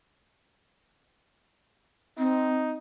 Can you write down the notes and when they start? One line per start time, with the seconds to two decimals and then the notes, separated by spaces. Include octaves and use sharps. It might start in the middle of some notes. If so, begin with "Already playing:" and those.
2.18 C4 D#4